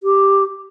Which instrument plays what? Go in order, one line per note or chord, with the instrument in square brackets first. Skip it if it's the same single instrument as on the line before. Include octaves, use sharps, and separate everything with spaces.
[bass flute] G4